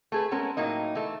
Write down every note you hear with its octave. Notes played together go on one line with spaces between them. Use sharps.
A3 G#4 B4
G#3 A3 B3 C#4 A#4
A2 F#3 A#3 D#4
E3 A3